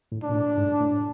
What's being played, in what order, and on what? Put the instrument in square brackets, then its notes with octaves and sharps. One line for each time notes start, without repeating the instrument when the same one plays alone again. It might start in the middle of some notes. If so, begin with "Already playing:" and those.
[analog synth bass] A2
[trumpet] D4
[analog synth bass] A#2
A2
G#2
A2